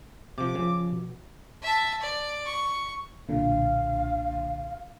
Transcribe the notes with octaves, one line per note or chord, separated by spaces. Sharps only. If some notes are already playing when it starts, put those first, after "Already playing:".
C3 F3 D6
C#3 F3
B2
E5 A5
D5
C#6
B1 A#2 D3 F5